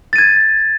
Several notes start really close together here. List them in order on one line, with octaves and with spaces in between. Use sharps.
A6 D#7 G#6